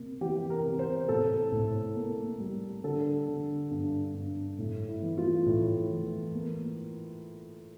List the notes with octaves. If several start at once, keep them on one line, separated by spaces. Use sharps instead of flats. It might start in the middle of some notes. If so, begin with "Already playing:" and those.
Already playing: C3 A#3
E3 G4
A#4
C3
C5
A2 A4
A2
A#3
G3
D3 A4
D3
G2
G2
A2
E4
E3
F4
A2
E3
A#3